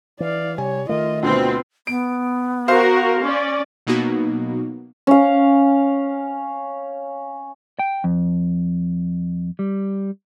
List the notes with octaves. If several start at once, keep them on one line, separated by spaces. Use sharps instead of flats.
E3 D5 F5
C3 G3 C#5 G#5
D#3 A3 F4 A#4 D#5
D2 B2 C4 F4 B4
B3 D7
F#4 A#4 C5 F5
C#4 D5
B2 F#3 A#3 B3 D#4 F#4
C#4 F5
G5
F2
G3